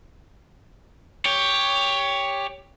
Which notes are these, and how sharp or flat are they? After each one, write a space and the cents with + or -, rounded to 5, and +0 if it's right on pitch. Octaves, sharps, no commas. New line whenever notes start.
G4 +15 C#5 +10